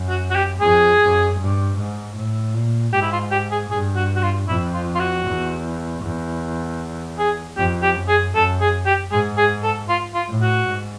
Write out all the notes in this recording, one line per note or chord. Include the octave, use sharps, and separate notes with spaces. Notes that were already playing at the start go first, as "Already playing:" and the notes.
Already playing: F#2
F#4
F#4
G4
F2 G#4
F#2
G2
G#2
A2
A#2
G#2 G4
E4
F4
G4
G#4
G2 G#4
F#4
F#4
F4
F2 E4
F4
F4
F#4
E2
E2
G#4
F2 G4
G4
F#2
G#4
F#2 A4
G#4
G4
G#2 G#4
G#4
A4
F4
F4
A2
F#4
G#2